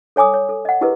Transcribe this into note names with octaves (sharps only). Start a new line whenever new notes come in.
A4 C#5 G#5 D6 D#6
C#5
A4
D#5 F#5
E4 G4 G#4 A#4 B4 D#5